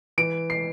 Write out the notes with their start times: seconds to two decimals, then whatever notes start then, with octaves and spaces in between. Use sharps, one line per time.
0.18 E3 D7
0.50 C7